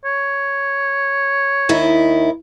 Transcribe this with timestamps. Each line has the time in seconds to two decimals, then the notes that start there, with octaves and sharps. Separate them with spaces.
0.05 C#5
1.69 D#2 D#3 E4